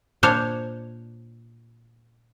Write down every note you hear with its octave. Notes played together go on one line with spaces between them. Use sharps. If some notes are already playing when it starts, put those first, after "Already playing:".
A#2 D4 C5 C#5 F5